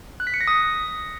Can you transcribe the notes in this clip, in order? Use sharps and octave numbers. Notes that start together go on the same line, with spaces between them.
F#6
B6
C#7
A#6
D#6